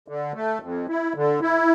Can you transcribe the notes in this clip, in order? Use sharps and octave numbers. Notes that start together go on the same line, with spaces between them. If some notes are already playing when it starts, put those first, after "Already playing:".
D3
A3
F2
E4
D3
E4